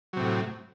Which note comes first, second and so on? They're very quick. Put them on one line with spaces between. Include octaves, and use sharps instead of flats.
F#3 C3 A2